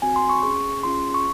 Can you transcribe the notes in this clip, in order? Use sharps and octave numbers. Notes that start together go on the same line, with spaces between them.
C4 F#4 G#5
C6
C#6
C#4 G#4 C#6
C#4 F4 G#4 C6
C#6